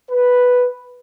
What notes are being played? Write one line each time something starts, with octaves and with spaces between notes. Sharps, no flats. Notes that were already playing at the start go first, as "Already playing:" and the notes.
B4